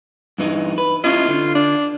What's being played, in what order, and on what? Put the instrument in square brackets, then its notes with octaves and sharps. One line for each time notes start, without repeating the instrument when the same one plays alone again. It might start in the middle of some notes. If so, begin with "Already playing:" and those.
[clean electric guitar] G2 E3 D#4
B4
[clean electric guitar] C#4 E4 D#5 [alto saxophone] F4
[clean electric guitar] D3
[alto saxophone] D4